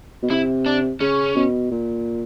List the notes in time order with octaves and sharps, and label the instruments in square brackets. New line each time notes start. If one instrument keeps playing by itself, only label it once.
[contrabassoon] B2
[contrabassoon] C3 [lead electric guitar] E4
[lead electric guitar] D4
[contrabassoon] C#3 [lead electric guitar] C#4
[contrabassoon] B2
A#2